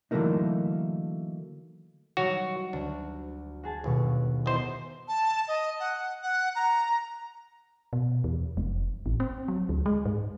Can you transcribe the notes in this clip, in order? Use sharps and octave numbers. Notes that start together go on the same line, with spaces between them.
D3 E3 F#3 A3 A#3 D#4
F#3 G3 D#4 F#4 C#5
D2 D4
F#4 G#4 A5
G1 D#2 B2 C#6
E2 C5 D#5
A5
D#5
F#5
F#5
A#5
B2
E2
F1
A1
C4
F#3
D2
G#3
G#2